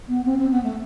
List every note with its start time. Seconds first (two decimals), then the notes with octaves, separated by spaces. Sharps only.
0.08 B3
0.25 C4
0.38 C4
0.50 B3
0.63 A3